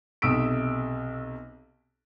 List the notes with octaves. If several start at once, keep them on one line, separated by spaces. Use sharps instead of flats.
B1 C3 D#6 E6 B6 D7